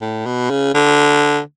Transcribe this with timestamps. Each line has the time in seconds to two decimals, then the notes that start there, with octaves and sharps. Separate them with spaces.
0.02 A2
0.26 B2
0.50 C#3
0.75 D3